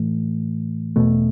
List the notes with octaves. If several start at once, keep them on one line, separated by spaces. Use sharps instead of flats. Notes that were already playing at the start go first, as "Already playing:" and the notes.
Already playing: A2 E3 A3
E2 B2 A3